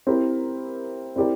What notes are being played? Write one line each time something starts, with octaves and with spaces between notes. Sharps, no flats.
C4 E4 G4 A#4
C4 E4 G4 A#4 D5